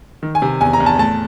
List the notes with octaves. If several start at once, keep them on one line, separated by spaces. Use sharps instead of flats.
D#3
G#5
C3
E2 G#5
A#5
E2
A5
A2 A5